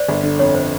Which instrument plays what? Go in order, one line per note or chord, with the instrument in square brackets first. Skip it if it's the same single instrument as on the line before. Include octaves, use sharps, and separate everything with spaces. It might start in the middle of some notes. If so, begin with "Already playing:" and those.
Already playing: [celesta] C5 D5
[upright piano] G1
D3
[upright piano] F2 [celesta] C#5
[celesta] C5